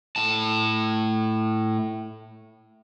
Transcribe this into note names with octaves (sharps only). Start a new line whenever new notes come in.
A2 A5